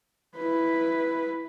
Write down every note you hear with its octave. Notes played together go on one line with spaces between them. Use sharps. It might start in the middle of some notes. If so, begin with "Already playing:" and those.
E4 B4